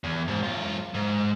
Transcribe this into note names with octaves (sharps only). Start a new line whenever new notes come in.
E2
G#2 B2
F#2 F4
G#2